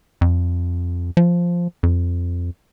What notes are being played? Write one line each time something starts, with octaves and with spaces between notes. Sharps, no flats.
F2
F3
F2